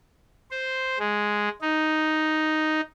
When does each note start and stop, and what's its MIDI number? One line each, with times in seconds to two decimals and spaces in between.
0.51 0.99 72
0.99 1.49 56
1.61 2.81 63